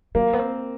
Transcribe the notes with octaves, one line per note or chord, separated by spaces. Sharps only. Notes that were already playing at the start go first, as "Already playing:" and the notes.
F#3 A#3
B3
C4